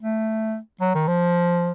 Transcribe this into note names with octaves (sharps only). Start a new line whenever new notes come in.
A3
F#3
D#3
F3